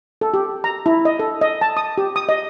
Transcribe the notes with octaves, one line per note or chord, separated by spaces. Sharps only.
A4
G4
A#5
E4
D#5
A4
D#5
A5
D#6
G4
D#6
D#5